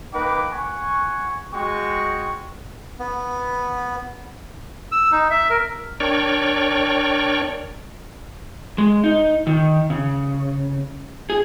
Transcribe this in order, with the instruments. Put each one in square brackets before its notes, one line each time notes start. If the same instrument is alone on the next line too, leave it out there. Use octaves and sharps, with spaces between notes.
[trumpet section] A#3 D#4 B4 G5 D6
F#5 G#5 C#6
G#3 F#4 G5 C#6
[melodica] B3
[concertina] E6
D#4
E5
A#4
[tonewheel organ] D4 A#4 C#5 D5 G5 C#6
[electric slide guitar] G#3
D#4
D#3
C#3
G#4